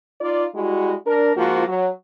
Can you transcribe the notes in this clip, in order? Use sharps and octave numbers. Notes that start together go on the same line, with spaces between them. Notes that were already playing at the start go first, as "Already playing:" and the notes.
D#4 F4 D5
G3 G#3 E4 F#4
D4 A#4
G#2 F3 A#3 F4 F#4
F#3